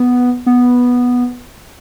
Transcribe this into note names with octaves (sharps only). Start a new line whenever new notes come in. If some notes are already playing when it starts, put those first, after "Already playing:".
Already playing: B3
B3